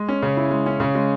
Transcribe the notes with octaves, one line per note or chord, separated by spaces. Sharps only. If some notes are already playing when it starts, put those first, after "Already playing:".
Already playing: G#3
C#4
C#3
E4
G#3
C#4
C#3
G#3